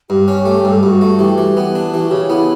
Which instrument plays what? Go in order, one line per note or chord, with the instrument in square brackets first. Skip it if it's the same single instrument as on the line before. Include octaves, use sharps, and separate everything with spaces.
[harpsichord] G2 [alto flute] G4
[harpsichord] C#4
A3
[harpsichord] G2 [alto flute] A4
[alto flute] G4
[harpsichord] G2 [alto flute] F#4
[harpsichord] A3
[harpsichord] E3 [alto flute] G4
[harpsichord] E3
B3
D4
[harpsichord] E3 [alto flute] G4
[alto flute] F#4
[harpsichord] C#3 [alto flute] G4
[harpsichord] B3 [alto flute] E4